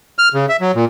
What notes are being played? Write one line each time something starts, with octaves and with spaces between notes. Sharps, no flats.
F6
C#3
E5
F#3
A#2